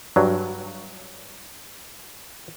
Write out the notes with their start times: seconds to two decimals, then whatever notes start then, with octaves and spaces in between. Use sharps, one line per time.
0.16 G2 F#3